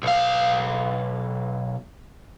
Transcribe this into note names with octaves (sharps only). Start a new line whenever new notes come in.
B1 F5